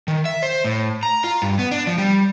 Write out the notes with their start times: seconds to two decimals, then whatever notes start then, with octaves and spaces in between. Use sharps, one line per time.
0.08 D#3
0.25 E5
0.43 C5
0.65 A2
1.03 A#5
1.24 F4
1.42 G2
1.59 B3
1.71 D4
1.87 F3
1.98 G3